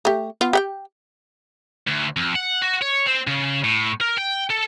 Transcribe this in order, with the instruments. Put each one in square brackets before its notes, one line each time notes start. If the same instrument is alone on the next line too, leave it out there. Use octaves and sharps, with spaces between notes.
[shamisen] A3 G4
B3 F4 F5
G4 F#5 G5
[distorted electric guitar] D2
F2
F#5
F#4
C#5
C4
C#3
A2
A#4
G5
A4